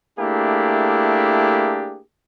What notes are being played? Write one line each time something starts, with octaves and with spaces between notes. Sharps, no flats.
A3 A#3 D4 E4 G4 G#4